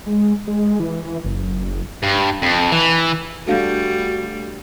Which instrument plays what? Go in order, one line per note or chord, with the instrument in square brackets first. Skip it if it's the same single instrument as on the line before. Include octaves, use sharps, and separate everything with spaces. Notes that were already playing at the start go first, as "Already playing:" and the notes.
[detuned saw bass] G#3
G#3
E3
F#1
[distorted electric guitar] G2
F2
E3
[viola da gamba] G3 [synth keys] A3 D4 [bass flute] F#4 [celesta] A4 F5 G6